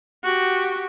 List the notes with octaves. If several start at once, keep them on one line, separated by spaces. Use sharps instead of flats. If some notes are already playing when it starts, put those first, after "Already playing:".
F#4 G4